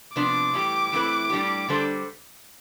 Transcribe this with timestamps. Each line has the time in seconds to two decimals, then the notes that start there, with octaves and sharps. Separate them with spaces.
0.16 C3 F3 B3 D4 D6
0.53 A2 E3 G3 D4 G4
0.92 E3 A3 C4 E4 B4
1.30 A2 G3 D4 G4
1.68 D3 G3 D4 A4 C5